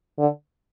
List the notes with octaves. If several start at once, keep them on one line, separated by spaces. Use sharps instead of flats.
D3